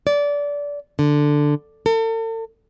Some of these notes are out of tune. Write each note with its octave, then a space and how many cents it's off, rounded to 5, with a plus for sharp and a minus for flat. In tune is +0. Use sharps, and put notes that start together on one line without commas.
D5 -20
D3 +5
A4 +40